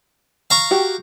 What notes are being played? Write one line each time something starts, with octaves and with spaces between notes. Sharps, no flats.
F5 A#5 C#6
F#4 G4